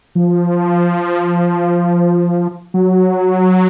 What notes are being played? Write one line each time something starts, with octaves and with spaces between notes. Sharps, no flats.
F3
F#3